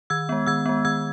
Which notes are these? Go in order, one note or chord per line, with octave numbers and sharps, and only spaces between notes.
D#3 E6 G#6
G#3 B3
D#3 E6 G#6
G#3 B3
D#3 E6 G#6